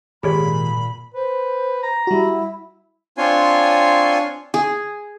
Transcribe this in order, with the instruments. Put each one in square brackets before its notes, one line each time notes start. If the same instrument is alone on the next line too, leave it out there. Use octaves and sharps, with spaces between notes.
[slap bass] G#1 [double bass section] A#2 [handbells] G4 G#4 C#5 [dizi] B5
[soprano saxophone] B4 [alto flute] C5
[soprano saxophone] A#5
[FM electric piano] G3 F#4 [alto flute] E4
[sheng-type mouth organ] C4 D4 F4 C#5 G#5 C6
[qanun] G#4